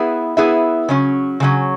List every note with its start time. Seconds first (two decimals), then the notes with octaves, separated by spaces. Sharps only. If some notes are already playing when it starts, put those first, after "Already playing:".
Already playing: B3 E4 G#4 B4 E5
0.37 B3 E4 G#4 B4 E5
0.89 C#3 F#3 C#4
1.40 C#3 F#3 C#4